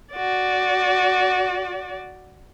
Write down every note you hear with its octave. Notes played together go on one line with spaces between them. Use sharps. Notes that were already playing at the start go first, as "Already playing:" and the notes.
F#4 D5